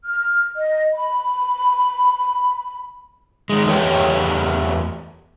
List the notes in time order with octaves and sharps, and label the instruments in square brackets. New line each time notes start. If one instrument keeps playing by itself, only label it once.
[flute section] F6
D#5
B5
[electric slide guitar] D#3 G#3
E2 A3 G4 B4 C#5 G5